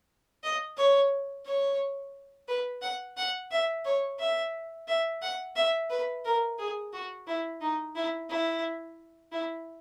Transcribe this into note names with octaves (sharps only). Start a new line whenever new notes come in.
D#5
C#5
C#5
B4
F#5
F#5
E5
C#5
E5
E5
F#5
E5
B4
A#4
G#4
F#4
E4
D#4
E4
E4
E4